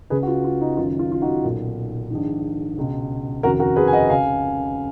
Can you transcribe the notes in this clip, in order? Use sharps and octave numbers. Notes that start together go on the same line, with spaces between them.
C#2 C#3 G#4 B4
F#4
F4
F4
D#4
F#1 F#2 D#3 F4
F4
F4
D#4 F#4
B1 A#2
A#1 G#2 D#3
C#2 B2
F1 D#2 C#3 F#4 A#4
F#4 A#4
G#4 B4
G#5
D#5 F#5
C#2 C#3 F5 G#5